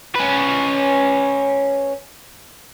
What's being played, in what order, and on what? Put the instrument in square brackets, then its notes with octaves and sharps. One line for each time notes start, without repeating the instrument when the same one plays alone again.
[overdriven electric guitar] C#4 B4